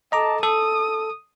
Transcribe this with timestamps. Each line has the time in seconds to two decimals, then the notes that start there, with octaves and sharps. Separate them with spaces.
0.12 A4 D#5 A5 A#5 D6
0.43 A4 D#6